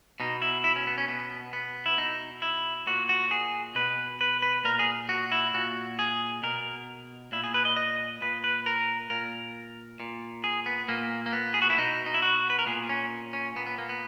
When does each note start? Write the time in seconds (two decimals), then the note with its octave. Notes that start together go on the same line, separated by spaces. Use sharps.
0.20 B2 D#4
0.42 E4
0.64 E4
0.76 C#4
0.87 B3
0.98 C#4
1.08 B2 B3
1.53 B3
1.86 E4
1.98 B2 D#4
2.42 E4
2.87 A#2 F#4
3.09 F#4
3.31 G#4
3.75 B2 B4
4.21 B4
4.42 B4
4.64 A#2 A#4
4.79 G#4
5.09 F#4
5.32 E4
5.54 A#2 F#4
5.99 G#4
6.43 B2 A#4
7.32 A#2 E4
7.44 G#4
7.54 B4
7.65 D#5
7.77 D#5
8.21 A#2 B4
8.44 B4
8.66 A#4
9.10 A#2 A#4
10.00 A#2
10.44 G#4
10.66 B3
10.88 A#2 A#3
11.26 A#3
11.33 B3
11.54 G#4
11.62 F#4
11.70 E4
11.77 B2 D#4
12.06 D#4
12.14 E4
12.22 F#4
12.50 B4
12.59 A#4
12.66 A#2 G#4
12.89 C#4
13.33 C#4
13.56 A#2 B3
13.67 B3
13.78 A#3
13.89 B3